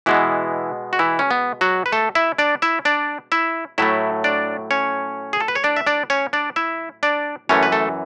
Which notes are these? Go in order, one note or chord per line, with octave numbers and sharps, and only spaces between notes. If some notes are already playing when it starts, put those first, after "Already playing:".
B2 E3 G#3 B3 E4
F#4
E3 E4
C#4
B3
F#3 F#4
B4
A3 A4
E4 E5
D4 D5
E4 E5
D4 D5
E4 E5
A2 F#3 A3 E4 E5
D4 D5
C#4 C#5
G#4
A4
B4
C#5
D4 D5
E5
D4 D5
C#4 C#5
D4 D5
E4 E5
D4 D5
F#2 E3 A3 C#4 C#5
B4
A3 A4